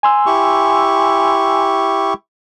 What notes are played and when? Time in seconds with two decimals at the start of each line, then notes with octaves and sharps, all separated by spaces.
0.03 G#5 C6 E6
0.26 E4 G4 C#6